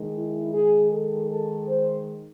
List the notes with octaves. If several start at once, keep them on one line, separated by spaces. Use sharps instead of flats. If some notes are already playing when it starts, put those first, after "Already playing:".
Already playing: D#3 G#3
E4
G#4
A4
A4
C5